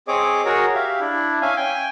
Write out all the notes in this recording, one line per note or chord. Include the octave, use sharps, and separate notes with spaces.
C4 G#4 C#5 D#5 D6
F#4 G#4 A#4 C#5
G4 E5 F5
D4 E4
C#4 E5 F5 G#5
G5 G#5